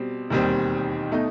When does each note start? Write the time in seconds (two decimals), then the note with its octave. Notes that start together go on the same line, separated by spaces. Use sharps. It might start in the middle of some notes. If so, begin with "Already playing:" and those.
Already playing: B2 G3 C4
0.30 E1 D#2 D#3 G3 C4
1.12 B2 A3 D#4